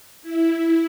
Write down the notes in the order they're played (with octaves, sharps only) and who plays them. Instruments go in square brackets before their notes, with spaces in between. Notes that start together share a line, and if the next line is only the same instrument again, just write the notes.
[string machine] E4